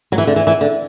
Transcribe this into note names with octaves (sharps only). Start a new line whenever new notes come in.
F#3
E3
D3
E3
E3
D3